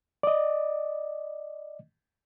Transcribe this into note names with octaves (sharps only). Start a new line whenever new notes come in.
D5 D#5